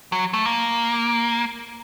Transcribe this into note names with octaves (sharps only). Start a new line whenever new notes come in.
F#3
A3
A#3